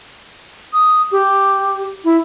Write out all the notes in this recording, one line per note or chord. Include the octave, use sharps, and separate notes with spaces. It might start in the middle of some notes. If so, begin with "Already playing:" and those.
D#6
G4
E4